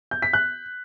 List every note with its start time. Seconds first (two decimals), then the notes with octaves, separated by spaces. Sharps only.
0.11 G6
0.22 B6
0.33 F#6